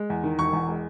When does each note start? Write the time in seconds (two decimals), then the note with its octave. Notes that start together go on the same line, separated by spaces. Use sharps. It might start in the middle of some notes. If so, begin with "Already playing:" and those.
Already playing: G#3
0.10 E2
0.24 D#3
0.39 E1 C#6
0.53 E2
0.68 G#3